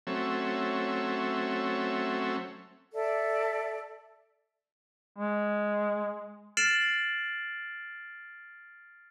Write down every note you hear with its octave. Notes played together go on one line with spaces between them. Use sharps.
F#3 A3 C4 C#4 E5
A4 D5 E5
G#3
F6 A6 C7 D7 E7 F#7